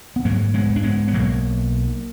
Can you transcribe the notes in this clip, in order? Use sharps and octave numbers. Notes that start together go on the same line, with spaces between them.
B3
G#2 F#3 A#3
G#3 B3
G#2
D4
G#3 B3
B3
B1 F#3 A#3